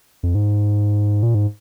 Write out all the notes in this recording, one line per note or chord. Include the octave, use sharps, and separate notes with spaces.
F2
G#2
A#2
G#2